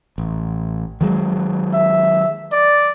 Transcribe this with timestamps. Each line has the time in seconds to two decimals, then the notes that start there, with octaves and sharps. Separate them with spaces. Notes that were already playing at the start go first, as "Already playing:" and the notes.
0.18 A1
1.01 D#3 F#3 G#3
1.74 E5
2.52 D5